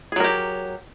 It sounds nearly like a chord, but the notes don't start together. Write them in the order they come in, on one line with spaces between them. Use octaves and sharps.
G#4 F#3 A#4 G4